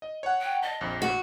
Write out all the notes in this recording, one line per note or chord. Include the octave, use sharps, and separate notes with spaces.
D#5
C#5 F#5
G5
D#5 A5
A#1 F2
F#4